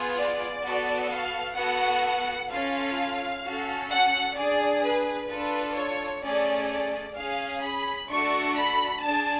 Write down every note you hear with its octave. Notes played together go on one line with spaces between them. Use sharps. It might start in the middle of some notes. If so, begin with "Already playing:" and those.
Already playing: B3 F4 G#4
D5
B3 F#4 A4
F5
B3 F#4 A4 F#5
C#4 F4 A4 F5
C#4 F#4 A4
F#5
D4 G#4 D5
B4
D4 F4 A4 B4
C#5
A3 C#4 G#4 D5
D5
C#4 G#4 F5
B5
A3 D4 F#4 A4 C#6
B5
D4 G#4 A5